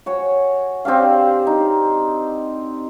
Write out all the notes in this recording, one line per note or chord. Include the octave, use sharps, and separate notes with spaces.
F#4 C#5 G#5
C4 D4 G4 F5
D#4